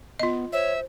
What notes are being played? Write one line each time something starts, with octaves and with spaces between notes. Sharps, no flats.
B3 F4 D#5
C5 C#5 E5